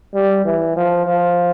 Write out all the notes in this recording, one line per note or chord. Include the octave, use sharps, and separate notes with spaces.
G3
E3
F3
F3